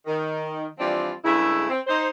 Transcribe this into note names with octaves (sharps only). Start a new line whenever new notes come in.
D#3
E3 F3 G3 C4 D4 F4
G2 C#3 G#3 A3 E4
C4
D#4 C5